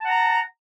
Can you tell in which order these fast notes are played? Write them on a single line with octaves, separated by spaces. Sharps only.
A5 F#5 A#5